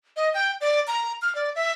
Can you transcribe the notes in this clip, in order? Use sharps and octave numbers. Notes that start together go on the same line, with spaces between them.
D#5
G5
D5
A#5
F6
D5
E5